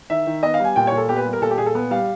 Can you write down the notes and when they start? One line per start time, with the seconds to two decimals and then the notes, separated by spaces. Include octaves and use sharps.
0.10 D#3 E5
0.27 D#3
0.43 B3 D#5
0.54 F5
0.59 G3 G#5
0.76 A#2 G5
0.87 A#2 C#5
0.97 A4
1.09 B3 G4
1.16 B4
1.25 G3
1.33 A#4
1.41 A#2 A4
1.50 G4
1.58 A#2 G#4
1.66 A4
1.75 B3
1.91 G3 F5